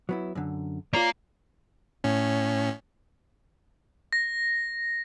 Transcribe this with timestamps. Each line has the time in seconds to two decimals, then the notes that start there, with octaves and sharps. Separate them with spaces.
0.09 F#3 B3 E4
0.35 F#2 D3
0.93 A#3 F4 C#5 D5 A#5
2.04 A2 C#4
4.13 A#6